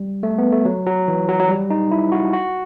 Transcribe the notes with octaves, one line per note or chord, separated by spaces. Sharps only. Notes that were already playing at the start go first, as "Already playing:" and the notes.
Already playing: G3
A3
B3
A3
F#3
F#3
E3
F#3
F#3
G3
D#4
E4
F#4
F#4